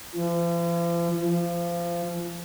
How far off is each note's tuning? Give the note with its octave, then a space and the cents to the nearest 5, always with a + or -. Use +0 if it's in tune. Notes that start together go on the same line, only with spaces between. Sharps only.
F3 -45
F3 -25